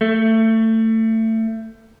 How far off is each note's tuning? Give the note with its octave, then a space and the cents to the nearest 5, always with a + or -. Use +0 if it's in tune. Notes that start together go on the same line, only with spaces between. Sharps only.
A3 +25